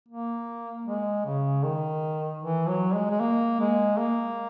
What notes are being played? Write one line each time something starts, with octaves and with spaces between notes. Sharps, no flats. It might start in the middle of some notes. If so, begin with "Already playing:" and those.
A#3
G#3
C#3
D#3
E3
F#3
G#3
G#3
A#3
G#3
A#3